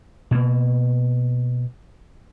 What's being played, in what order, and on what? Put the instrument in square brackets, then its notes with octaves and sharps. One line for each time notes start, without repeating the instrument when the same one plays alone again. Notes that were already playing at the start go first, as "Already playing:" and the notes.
[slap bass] B2 A#3